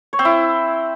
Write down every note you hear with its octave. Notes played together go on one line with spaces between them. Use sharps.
C#5
C4
E4